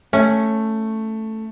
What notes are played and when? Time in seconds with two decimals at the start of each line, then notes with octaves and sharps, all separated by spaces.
0.13 A3 C#4